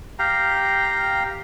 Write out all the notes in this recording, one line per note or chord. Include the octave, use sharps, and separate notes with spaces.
G4 F5 G5 A#5